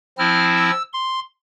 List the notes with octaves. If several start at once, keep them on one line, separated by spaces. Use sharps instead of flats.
F3 C4 E4 F6
E6
C6